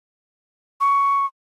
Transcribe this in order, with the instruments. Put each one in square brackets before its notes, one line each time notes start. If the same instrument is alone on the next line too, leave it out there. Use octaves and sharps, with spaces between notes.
[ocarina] C#6